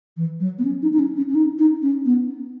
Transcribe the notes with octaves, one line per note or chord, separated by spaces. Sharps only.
E3
F#3
B3
C#4
D#4
D#4
C#4
C#4
C#4
D#4
D#4
C#4
B3